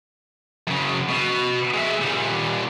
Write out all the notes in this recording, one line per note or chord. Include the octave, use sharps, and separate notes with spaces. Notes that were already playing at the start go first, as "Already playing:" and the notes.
F#2 C#3
B2
G#3 E5
A#2 G3